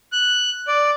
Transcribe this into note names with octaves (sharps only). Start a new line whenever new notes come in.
F#6
D5